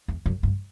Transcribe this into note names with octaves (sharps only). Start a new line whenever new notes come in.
E2
F#2
G2